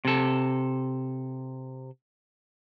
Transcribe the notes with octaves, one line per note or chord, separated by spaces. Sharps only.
C3 A4